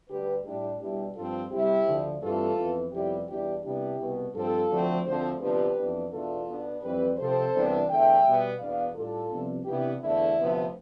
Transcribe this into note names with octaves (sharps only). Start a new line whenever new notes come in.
D2 D3 G3 G4 B4
A2 G3 D4 E4 G4
B2 G3 B3 D4 E4 G4
G2 F3 C4 F4 A4
C3 G3 C4 E4 G4
D2 D3 F3
G2 E3 A3 C4 F4 A4
F2 E3 B3
F2 C3 G3 B3 E4 G4
E2 B2 G3 D4 E4 G4
C3 G3 B3 D4 E4 G4
C2 B2 B3
G2 F3 C4 F4 A4
D2 D3 F3 A3 C4
D2 D3 F3 C4 A4 C5
D2 C3 F3 B3 D4 G4 B4
F2 E3 B3 D4
E2 B2 A3 D4 F4 A4
B2 B3 D4
F2 E3 G3 C4 G4 B4
C3 F3 C4 A4 C5
C2 C3 E3 B3 D4
E2 D3 A3 E5 G5
B2 G3 B3
E2 B2 B3 D4 D5 F5
A2 G3 D4 F4 A4
C2 C3 F3 B3 D4
C3 E3 B3 D4 E4 G4
E2 D3 A3 E4
D2 C3 F3 B3